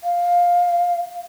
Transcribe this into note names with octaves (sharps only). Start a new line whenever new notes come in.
F5